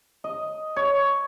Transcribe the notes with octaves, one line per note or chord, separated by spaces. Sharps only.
D#5
C#5